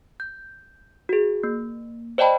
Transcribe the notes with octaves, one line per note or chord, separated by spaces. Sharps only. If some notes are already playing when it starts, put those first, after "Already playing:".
G6
F#4 G#4
A#3
C5 D5 D#5 G5 A5 B5